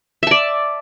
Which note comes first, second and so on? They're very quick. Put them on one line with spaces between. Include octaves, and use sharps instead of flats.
E5 A5 D5